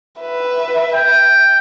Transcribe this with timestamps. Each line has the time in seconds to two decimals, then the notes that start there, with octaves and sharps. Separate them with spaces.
0.21 B4 E5
0.93 G5